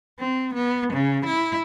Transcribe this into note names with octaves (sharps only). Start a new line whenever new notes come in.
C4
B3
C#3
E4